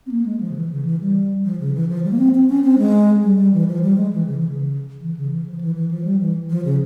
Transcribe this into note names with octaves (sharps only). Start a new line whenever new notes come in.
C4
A#3
G#3
F3
C#3
E3
C#3
E3
G3
F3
C#3
E3
F3
G3
A#3
C4
C4
C#4
C4
G#3
G3
G3
E3
F3
G3
G#3
E3
C#3
E3
C#3
E3
C#3
E3
F3
E3
E3
F3
G3
E3
F3
C#3